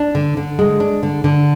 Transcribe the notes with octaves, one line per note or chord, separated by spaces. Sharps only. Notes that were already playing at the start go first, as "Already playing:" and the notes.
Already playing: D4
D3
D3
G#3
D4
D3
D3